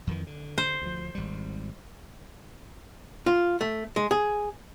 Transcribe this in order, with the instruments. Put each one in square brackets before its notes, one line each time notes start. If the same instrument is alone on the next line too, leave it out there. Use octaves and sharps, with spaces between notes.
[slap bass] F2 D#3 E3
D3
[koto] C5
[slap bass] D2 F3
G#1 G3
[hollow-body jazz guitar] F4
A3
G#3
G#4